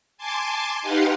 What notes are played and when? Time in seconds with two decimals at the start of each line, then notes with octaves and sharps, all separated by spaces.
0.17 G#5 A5 C6 D6
0.82 D#4 G4 B4 F5 F#5 C6